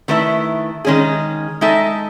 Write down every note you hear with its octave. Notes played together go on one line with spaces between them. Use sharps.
D#3 A3 E4 B4 E5
D#3 G#3 C#4 G#4
G#3 D#4 A4 E5